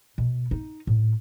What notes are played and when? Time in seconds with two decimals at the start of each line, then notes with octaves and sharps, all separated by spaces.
0.18 B2
0.51 D#4
0.87 A2